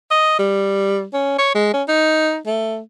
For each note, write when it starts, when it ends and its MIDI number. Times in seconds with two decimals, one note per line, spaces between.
0.11 0.38 75
0.39 1.05 55
1.13 1.38 61
1.38 1.53 73
1.55 1.69 56
1.73 1.83 61
1.88 2.38 63
2.46 2.79 57